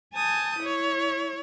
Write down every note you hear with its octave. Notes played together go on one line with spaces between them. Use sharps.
G#5 A5 D#6 G6
E4 C#5